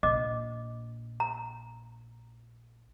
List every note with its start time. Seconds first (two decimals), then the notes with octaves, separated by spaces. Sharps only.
0.03 A#1 D#5 D6
1.20 A#5